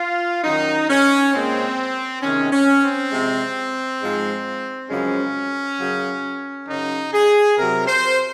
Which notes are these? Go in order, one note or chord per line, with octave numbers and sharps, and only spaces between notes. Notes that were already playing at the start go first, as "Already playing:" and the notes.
Already playing: F4
F#2 D#3 F#3 D#4
C#4
A#2 G#3 C4
C3 D#3 G#3 C#4
C#4
C4
C3 F3 G#3
G#2 F3 G#3
F#2 C#3 F3 G#3 C#4
F#2 C#3 F#3
F#2 C#3 F#3 D#4
G#4
C3 F#3 A#4
C5